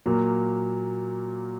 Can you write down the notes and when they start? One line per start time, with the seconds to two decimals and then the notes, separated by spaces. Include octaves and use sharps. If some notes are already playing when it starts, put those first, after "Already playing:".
0.06 A#2 F#3 A#3